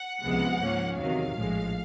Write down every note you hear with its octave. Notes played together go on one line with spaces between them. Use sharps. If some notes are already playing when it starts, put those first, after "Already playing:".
Already playing: F#5
C#2 C3 F3 G#3 B3
G#2 F3 A#3 C#4
E2 C3 D#3 F#3 F5
A#1 A2 F3 G#3